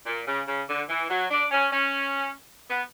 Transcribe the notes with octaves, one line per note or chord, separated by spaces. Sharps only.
A#2
C#3
C#3
D3
E3
F#3
D4
C#4
C#4
B3